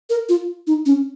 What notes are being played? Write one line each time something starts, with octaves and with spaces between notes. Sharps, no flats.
A#4
F4
D#4
C#4